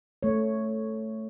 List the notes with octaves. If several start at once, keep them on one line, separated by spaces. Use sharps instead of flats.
A3 C#5